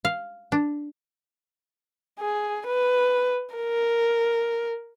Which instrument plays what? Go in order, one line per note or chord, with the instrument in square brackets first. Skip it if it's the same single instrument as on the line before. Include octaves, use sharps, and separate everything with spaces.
[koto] F5
D4
[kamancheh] G#4
B4
A#4